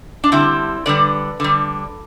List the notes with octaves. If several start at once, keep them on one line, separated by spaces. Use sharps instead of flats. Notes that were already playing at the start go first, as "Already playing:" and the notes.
D4
D3 G3 C4 E4
D3 G3 B4 D5
D3 G3